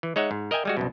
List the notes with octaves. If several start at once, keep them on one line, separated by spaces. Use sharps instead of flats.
E3
G#3 D#4 C#5 E5 F#5
G#2
A#4 D#5 E5 G5 G#5
G3 G#3 F#4
C2 F#2 B2